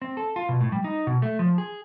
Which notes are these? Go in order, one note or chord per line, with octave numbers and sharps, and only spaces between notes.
C4
A4
F4
B2
A2
G3
D#4
B2
A3
F3
G#4